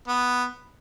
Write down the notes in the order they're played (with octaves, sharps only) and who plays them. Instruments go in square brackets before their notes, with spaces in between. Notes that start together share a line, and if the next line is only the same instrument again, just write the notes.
[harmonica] B3